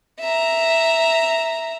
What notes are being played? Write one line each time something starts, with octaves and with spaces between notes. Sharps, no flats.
E5 A#5